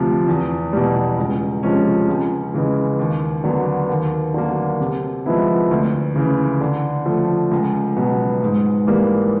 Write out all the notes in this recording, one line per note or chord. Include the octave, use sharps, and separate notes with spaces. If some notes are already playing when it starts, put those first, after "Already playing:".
Already playing: D2 C3 F3
E2
B2 G3
C#2
C3 F3 G#3 C#4
C#2
C#3 E3 G#3
D#2
D3 F#3 B3
D#2
D3 F#3 A#3
C3
F3 G#3 B3 E4
D2
C#3 E3
D3
F3 A3
C#2
B2 F#3 B3
G#2
E3 G3 A#3